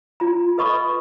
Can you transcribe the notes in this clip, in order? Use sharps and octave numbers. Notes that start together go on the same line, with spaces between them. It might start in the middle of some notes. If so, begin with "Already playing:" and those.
F4 A#5
A4 B4 D#5 B5 C#6 D#6